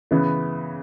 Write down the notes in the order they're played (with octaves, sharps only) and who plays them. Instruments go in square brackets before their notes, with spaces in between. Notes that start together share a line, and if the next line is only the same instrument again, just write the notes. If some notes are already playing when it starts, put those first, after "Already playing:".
[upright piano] C#3 E3 B3